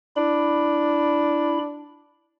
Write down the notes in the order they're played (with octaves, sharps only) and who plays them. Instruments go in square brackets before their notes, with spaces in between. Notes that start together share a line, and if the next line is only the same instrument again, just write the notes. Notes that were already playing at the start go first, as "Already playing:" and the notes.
[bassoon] D4 [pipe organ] E4 B5